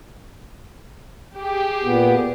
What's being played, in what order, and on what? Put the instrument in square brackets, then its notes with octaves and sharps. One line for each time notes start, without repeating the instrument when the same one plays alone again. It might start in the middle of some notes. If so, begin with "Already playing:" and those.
[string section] G4 G#4
[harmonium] A#2 B3